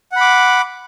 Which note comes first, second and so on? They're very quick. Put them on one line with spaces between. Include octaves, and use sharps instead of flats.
F#5 B5 D6